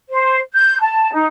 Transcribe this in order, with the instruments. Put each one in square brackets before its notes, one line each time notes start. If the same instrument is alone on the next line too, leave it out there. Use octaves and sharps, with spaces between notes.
[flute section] C5
G6
A5
D#4